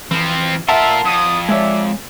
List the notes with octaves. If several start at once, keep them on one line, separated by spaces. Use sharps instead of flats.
E3 F3 C4
F4 A#4 E5 F#5 A5 C6
F2 D#6
G#3 C#5 D5 E5